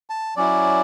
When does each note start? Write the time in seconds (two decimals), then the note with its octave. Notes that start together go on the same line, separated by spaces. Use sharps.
0.10 A5
0.36 F#3 C#4 E4 D5